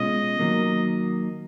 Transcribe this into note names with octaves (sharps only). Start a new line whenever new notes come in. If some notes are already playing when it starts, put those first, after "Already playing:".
Already playing: B2 G#3 C#4 F4 D#5
D#3 F#3 A#3